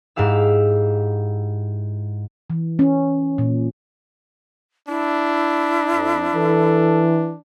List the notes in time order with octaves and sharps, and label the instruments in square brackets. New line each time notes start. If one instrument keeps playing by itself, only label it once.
[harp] G#2 E4 G4 F5 E6
[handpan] E3
C#4
A#2
[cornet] D4 [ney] E4
[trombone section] F2
[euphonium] E3 [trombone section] A4